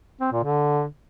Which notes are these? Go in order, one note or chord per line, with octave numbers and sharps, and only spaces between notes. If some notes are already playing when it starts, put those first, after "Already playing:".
C4
A#2
D3